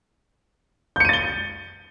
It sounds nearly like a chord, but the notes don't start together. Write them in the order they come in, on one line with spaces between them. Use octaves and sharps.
G6 C#7 D#7 A6 G7